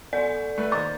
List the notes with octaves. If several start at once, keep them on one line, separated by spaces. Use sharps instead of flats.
B2 A4 C5 D5 F#5 G6
A3 B4
D#3 A#3 C5 D#5 A#5 C#6 A6